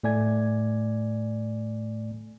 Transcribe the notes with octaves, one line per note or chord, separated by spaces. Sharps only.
A2 A3 D5 G#5 G#6